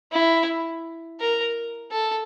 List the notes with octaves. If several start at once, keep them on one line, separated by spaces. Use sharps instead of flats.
E4
A#4
A4